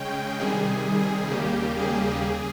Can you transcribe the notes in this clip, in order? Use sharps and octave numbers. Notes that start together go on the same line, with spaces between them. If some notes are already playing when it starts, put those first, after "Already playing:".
Already playing: C#3 G#3 C#4 G5
C3 D#3 G3 G#4
G#4
G#4
D#2 C#3 G3 A#3 G4
G#4
C#3 G#4